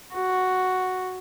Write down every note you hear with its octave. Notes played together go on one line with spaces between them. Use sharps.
F#4